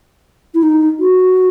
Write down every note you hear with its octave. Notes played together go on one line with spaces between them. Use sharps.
E4
D#4
F#4